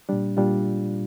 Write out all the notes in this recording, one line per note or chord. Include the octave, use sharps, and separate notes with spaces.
A#2 G3 D4
A#2 G3 D4 F4